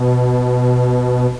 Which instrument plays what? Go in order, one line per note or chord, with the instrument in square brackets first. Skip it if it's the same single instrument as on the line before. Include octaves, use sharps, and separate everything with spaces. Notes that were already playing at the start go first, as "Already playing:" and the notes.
Already playing: [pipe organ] B2